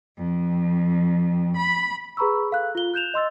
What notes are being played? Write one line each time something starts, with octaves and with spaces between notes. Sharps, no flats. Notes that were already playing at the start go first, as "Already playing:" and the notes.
F2
B5
G#4 B4 A#5 B5 C#6 E6
A4 F5 F#6
F4 G7
F#6 G6 E7 F7
D#5 C6 E6 A6